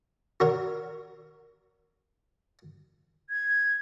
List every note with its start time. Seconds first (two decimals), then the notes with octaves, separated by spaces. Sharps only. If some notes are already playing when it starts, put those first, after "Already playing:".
0.40 F#4 A#4 C#5
3.29 G#6